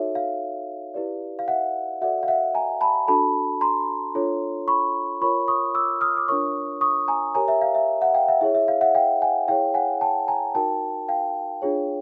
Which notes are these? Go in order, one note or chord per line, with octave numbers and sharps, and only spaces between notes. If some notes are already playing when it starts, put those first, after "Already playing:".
Already playing: D#4 F#4 A4 C#5 E5
F5
E4 G4 B4 D5
F5
E5 F#5
F#4 A4 D5 E5 F#5
F5
E5 F#5
G#5 A#5
A5 B5
D4 F#4 A4 A5 B5
A#5 C6
D4 F4 A4 C#5
B5 C#6
F4 A#4 C#5 B5 C#6
C#6 D#6
D6 E6
D#6 F6
D6
D4 F4 A#4 C#5 C#6 D#6
C#6 D#6
G#5 A#5
G4 A#4 C#5 G#5 A#5
E5
F5
E5
E5 F#5
F5 G5
E5 F#5
E4 G#4 C#5 E5
E5
F5
E5 F#5
F5 G5
F#5 G#5
E4 G#4 C#5 F5 G5
F#5 G#5
G5 A5
G#5 A#5
D#4 F#4 A#4 G5 A5
F5 G5
D4 F4 G#4 C#5